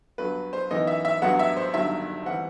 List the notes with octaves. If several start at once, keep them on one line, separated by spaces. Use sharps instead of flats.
G2 F#3 B3 B4
C5
F#2 E3 B3 D#4 D#5
E5
E5
A1 G2 F#3 B3 F#5
E5
C5
G1 G2 D#3 F#3 E5
E3 G3 C4 F#5